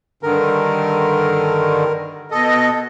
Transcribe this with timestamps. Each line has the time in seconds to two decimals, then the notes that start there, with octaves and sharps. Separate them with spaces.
0.23 G2 D3 D#3 A#4
2.31 B2 A4 D#5